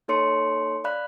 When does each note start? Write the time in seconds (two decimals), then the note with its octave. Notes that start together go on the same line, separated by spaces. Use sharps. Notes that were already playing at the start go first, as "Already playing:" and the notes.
0.08 A#3 D#4 A4 C#5 C6 C#7
0.84 D5 F5 B5 F#6